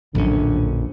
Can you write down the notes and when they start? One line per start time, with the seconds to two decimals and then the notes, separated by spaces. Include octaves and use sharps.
0.15 A#1 F2 A2 D3 F#3 C#4